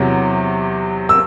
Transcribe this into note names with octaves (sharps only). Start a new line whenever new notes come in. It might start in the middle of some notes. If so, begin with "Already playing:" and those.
Already playing: E2 C3 F#3
E6